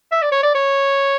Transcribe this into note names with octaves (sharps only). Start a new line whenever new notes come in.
E5
D5
C#5
D5
C#5